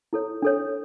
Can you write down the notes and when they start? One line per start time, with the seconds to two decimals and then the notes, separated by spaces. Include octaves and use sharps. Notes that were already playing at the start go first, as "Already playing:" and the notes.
0.13 E4 A4 C#5
0.42 D4 A4 C#5